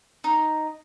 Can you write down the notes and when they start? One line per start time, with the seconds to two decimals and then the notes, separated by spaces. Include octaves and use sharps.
0.24 D#4